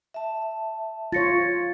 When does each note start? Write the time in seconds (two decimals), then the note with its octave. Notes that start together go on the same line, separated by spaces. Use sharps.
0.14 E5 A5
1.12 F4 C#5 A6 A#6 C#7